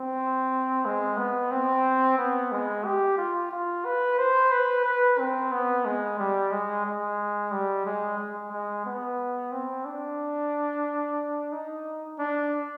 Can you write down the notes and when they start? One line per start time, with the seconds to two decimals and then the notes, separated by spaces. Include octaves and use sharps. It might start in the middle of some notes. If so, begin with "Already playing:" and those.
Already playing: C4
0.85 G#3
1.18 B3
1.51 C4
2.18 B3
2.52 G#3
2.85 G4
3.18 F4
3.51 F4
3.85 B4
4.18 C5
4.51 B4
4.84 B4
5.19 C4
5.52 B3
5.85 G#3
6.19 G3
6.51 G#3
6.85 G#3
7.51 G3
7.85 G#3
8.18 G#3
8.51 G#3
8.86 B3
9.52 C4
9.85 D4
11.52 D#4
12.19 D4